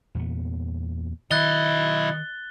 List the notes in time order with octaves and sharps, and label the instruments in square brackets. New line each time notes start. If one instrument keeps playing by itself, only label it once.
[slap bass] E2 A#2 B3
[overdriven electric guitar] B1 D#5 [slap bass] D#3 [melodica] E4 [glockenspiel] F#6 A6 G7